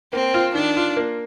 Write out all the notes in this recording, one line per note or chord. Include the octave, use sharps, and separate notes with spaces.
A#3 C4
F4
D#3 D4
F4
A#3